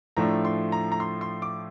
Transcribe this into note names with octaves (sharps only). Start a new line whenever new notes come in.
A2 F3 A3 D4 A#5
C6
A#5
A#5
C6
C6
D6